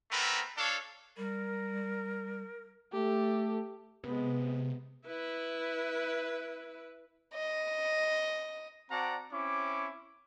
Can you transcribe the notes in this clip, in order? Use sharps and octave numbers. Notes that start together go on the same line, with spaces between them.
A3 B3 C4 A#4
D4 A4 C#5 F5
G3 A#4
A3 G4 A4
C3 G#3 B3
E4 B4
D#5
C4 F#4 D5 F#5 A5 A#5
C4 C#4 E4 D6